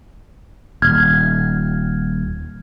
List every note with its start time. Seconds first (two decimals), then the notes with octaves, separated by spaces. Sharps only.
0.82 D#1 F6 G#6